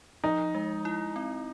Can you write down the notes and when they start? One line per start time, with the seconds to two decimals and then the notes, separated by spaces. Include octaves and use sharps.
0.24 F3 D#4
0.55 G#3
0.85 E4
1.16 C4